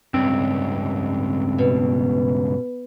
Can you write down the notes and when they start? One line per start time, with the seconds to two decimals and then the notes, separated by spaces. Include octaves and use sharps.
0.14 C#2 G2 C4
1.58 B2